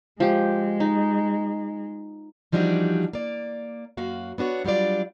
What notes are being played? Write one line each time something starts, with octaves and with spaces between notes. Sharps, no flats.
F3 G#3 G4
D#4
E3 F3 G3 D4 D#4 F#4
A#3 D5
F#2 A#3 F#4 F5
B3 D4 F#4 C#5
F#3 G3 D4 F4 D5